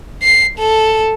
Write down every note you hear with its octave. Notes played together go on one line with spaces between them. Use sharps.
C7
A4